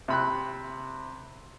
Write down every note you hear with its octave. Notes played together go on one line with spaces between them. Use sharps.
C3 B5 F#6